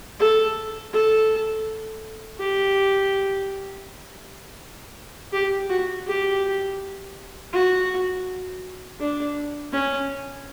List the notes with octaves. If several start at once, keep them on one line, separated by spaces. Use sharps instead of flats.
A4
A4
G4
G4
F#4
G4
F#4
D4
C#4